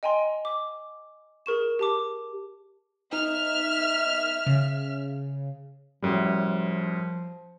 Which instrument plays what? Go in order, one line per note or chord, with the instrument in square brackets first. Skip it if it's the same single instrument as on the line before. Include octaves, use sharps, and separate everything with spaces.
[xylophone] D#5 G5 G#5 A#5 C6
D6
G#4 A#4 C#6 E7
G4 A5 D6
[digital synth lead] D#4 [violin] E5 F6
[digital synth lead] C#3
[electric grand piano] F#2 A2 G3 [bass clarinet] F3